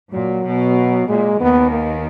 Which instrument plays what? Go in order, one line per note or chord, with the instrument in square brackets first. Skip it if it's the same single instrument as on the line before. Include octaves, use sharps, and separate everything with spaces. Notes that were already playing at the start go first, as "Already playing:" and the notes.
[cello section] A#2 [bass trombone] F#3
[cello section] B2
[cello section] A#2 [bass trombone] G#3
[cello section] D#2 D#3 [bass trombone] B3
[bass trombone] A#3